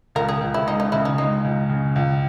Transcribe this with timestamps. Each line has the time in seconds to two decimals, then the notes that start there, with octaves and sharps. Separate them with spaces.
0.15 C#2 A#4
0.29 G#4
0.41 C#2
0.54 E4
0.67 G#3 D#4
0.80 D#4
0.92 C#3 E4
1.05 D#4
1.18 G#3 D#4
1.44 C#2
1.69 C#3
1.96 C#2